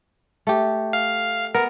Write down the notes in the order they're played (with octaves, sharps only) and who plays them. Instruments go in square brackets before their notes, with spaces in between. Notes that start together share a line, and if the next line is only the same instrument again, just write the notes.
[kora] A3 G4
[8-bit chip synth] F5
[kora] B3 [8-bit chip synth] A#4